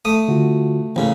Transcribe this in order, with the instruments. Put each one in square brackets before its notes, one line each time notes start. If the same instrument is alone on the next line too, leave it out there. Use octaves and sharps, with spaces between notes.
[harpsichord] A3 D#6
[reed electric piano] D3 F4 F#4
[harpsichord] A1 C#3 [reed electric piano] E3 A#3